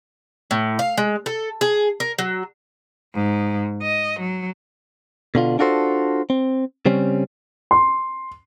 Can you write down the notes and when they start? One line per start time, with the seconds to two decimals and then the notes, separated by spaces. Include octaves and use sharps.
0.51 A2
0.79 F5
0.98 G#3
1.26 A4
1.61 G#4
2.00 A#4
2.19 F#3
3.14 G#2
3.83 D#5
4.20 F#3
5.35 B2 D3 F4
5.59 D4 F4 F#4 A4 C5
6.30 C4
6.86 C#3 G3 C4 C#4
7.71 C6